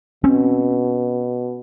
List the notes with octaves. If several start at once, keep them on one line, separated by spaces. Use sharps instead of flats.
B2 C4 C#4